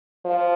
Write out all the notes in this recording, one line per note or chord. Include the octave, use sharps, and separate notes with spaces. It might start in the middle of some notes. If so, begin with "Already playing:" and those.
F3